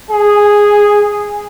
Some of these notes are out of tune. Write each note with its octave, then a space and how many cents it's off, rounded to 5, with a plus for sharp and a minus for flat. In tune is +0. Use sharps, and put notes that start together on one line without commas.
G#4 -5